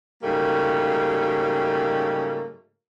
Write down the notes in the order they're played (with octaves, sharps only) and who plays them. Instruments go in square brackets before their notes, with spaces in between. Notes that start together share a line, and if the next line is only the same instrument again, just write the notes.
[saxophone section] G#2 C#3 F#3 G3 A3 A#3